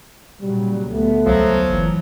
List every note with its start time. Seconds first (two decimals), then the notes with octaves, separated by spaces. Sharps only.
0.42 A#2 C#3 F#3 G3
0.89 D2 A3 B3
1.26 C2 F3 F#3
1.69 F#1 E3